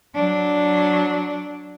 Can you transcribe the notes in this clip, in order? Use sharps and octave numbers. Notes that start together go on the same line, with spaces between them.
F#3 D4